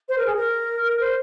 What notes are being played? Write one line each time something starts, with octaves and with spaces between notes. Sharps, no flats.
C5
A#4
G#4
A#4
C5